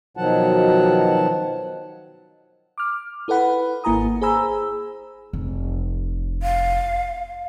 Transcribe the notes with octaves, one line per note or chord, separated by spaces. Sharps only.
B2 D#3 F3 F#3 F#5 A5
D6 F6
E4 A4 B4 F#5 B5
G#1 A#3 E4 G#5 A#5 D#6
G#4 C5 G#5 A#5 B5 E6
F1
F5